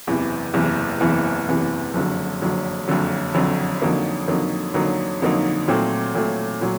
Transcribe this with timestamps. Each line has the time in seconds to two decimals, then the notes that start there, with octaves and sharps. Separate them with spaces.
0.07 F#1 E2 C3 E3
0.54 F#1 E2 C3 E3
1.00 F#1 E2 C3 E3
1.48 F#1 E2 C3 E3
1.94 F#1 F2 D3 F#3
2.41 F#1 F2 D3 F#3
2.88 F#1 F2 D3 F#3
3.34 F#1 F2 D3 F#3
3.82 F2 D3 F#3 A#3 D#4
4.27 F2 D3 F#3 A#3 D#4
4.74 F2 D3 F#3 A#3 D#4
5.22 F2 D3 F#3 A#3 D#4
5.68 A#2 F#3 A3 C4
6.15 A#2 F#3 A3 C4
6.61 A#2 F#3